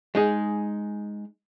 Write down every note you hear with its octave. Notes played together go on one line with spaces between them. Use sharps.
G#3 D#4 G#4